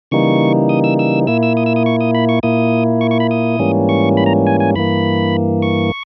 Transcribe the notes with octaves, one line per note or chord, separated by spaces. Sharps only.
C#3 E3 G3 A#3 D#4 C#6
D#6
E6
E6
A#2 A#3 E4 E6
E6
D#6
E6
D#6
C#6
D#6
B5
C#6
A#2 A#3 E4 D#6
C#6
C#6
B5
D#6
G#2 E3 G3 A#3 C#4
C#6
B5
A#5
G#5
G#5
G2 E3 A#3 B5
C#6